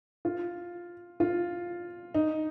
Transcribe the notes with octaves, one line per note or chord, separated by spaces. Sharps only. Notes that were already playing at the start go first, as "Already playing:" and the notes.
F4
F4
D#4